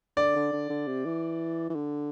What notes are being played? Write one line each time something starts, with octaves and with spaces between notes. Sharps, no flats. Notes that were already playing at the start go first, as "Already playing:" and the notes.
D3 D5
D3
D3
D3
C3
E3
E3
D3